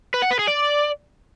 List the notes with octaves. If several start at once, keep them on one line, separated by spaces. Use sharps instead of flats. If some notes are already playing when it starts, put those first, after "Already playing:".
B4
F#5
B4
G#4
D5